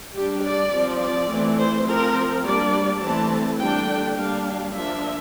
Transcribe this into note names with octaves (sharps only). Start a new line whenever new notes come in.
G3 D4 G4
D5
F3 C4
D5
E3 A3 C4
C5
F3 C4 A#4
G3 A#3 D4 D5
E3 A3 C4 A5
D3 G3 A#3 D4 G5
G3 A#3 D4 F5
F3 A#3 D4 E5